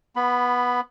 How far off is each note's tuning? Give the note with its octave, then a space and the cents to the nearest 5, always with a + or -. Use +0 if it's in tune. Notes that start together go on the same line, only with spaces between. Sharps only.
B3 -10 B5 +10